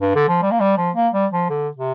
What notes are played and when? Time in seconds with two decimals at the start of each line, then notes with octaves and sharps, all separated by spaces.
0.01 G2
0.15 D3
0.29 F3
0.42 G3
0.51 A#3
0.60 G3
0.78 F3
0.96 A#3
1.14 G3
1.32 F3
1.50 D3
1.77 C3